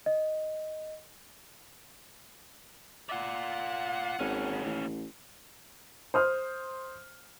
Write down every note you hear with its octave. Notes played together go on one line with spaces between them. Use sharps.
D#5
F4 D5 F#5
G#1 D#2 C#4
A1
C5 D#6 F6